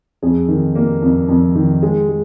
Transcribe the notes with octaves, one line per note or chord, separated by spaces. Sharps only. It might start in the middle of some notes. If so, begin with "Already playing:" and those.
F2 G#4
D#3
A#3
F2
F2
D#3
G#3 G#4
G#3